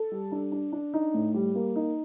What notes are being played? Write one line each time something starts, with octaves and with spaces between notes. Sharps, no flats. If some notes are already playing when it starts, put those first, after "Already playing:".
Already playing: A4
G3
D4
D4
D4
D#4
A2
G3
A#3
D#4